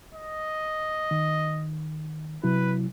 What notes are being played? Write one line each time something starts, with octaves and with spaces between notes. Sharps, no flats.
D#5
D#3
C3 F#3 E4 B4